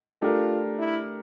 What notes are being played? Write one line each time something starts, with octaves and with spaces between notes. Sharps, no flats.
A3 D4 F4 G4 A#4
E4